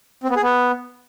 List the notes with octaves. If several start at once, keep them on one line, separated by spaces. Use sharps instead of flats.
C4
B3
G#4
B3